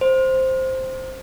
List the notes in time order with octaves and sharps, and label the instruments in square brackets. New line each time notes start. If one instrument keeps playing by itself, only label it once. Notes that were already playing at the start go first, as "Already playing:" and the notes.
[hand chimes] C5